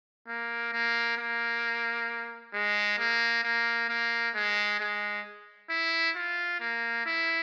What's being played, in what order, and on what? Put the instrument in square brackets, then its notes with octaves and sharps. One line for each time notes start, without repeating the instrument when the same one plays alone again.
[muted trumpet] A#3
A#3
A#3
G#3
A#3
A#3
A#3
G#3
G#3
E4
F4
A#3
E4